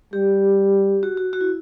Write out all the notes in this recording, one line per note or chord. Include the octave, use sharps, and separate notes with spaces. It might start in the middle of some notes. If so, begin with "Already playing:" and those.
G3 G4
F#4
F#4
F#4
E4